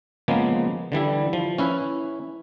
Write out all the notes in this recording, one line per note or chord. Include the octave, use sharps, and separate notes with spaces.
C#3 F3 G#3 A#3 B3
D3 E3 G3 E4
F3
C#4 E4 B4